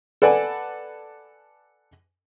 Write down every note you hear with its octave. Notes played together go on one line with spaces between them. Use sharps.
A4 B4 D5 F#5 G#5